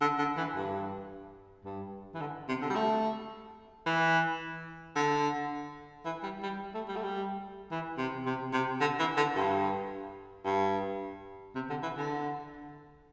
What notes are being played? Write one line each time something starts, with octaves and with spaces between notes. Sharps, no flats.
D3
D3
E3
G2
G2
E3
D3
C3
D3
G3
A3
E3
D3
E3
G3
G3
A3
G3
A3
G3
E3
C3
C3
C3
D3
E3
D3
G2
G2
C3
D3
E3
D3